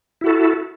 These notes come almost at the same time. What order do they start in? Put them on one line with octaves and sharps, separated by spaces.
E4 F#4 A4